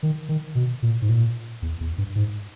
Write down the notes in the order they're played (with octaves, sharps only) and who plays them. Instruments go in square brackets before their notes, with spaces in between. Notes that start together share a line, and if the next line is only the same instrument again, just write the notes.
[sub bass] D#3
D#3
B2
A#2
G#2
A#2
E2
E2
G2
G#2